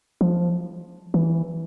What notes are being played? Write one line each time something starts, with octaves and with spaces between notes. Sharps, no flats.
F3
E3